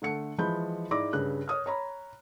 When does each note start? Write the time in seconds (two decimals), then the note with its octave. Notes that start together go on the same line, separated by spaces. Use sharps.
0.02 D3 A3 F#5 C#7
0.38 E3 F3 G#3 B5 G6
0.91 G#2 E4 D5 D6 A#6
1.13 G2 C#3 F#6
1.48 C#5 D#6 F6
1.66 C#5 A#5 B5